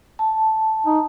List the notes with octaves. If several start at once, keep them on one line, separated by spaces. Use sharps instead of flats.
A5
D#4